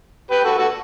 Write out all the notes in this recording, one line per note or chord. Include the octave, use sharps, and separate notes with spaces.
G4 B4
F#4 A4
F#4 A4